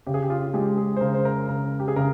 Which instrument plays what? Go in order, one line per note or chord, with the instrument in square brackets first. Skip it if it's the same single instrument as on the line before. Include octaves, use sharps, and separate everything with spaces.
[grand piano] C#3 [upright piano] G4
[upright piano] G#4
G4
F4
[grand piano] G#3 [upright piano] G4
[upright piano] G#4
C5
[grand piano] C#3 [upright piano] A#4
[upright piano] C5
A#4
[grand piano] C#3 [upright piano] A#4
[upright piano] G4
G#4
[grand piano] C#3 [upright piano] A#4